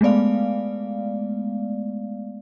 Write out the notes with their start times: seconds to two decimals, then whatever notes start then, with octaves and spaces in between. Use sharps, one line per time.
0.01 G#3 A3 B3 D5 F5